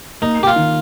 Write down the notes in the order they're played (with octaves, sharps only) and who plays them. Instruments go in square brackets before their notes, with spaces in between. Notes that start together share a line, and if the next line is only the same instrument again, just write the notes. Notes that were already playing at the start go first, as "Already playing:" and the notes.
[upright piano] A#3 [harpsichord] D#4
[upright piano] A#3 [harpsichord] G4
[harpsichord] F4
[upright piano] D#3